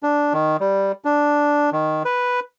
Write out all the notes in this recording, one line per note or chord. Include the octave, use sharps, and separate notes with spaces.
D4
D#3
G3
D4
D#3
B4